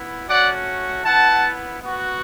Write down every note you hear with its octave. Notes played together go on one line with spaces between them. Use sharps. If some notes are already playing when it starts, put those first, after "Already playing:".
Already playing: B3 E4
A3 C#4 F#4 D5 F#5
B3 E4 F#5 A5
B3 F#4